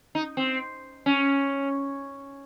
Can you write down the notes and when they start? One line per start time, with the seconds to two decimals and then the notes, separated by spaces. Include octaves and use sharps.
0.15 D#4
0.37 C4
1.06 C#4